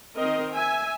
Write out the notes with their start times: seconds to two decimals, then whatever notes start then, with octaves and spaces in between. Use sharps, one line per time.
0.16 D#3 C4 A#4 D#5
0.53 E5 G#5